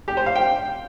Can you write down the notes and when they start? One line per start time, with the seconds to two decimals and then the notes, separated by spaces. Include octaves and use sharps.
0.08 G4
0.17 C5
0.26 F5
0.36 G5